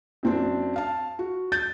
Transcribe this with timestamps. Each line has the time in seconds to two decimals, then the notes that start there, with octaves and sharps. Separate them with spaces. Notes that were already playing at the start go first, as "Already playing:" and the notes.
0.23 F#2 C4 D4
0.76 F5 A5
1.19 F#4
1.52 G6 A6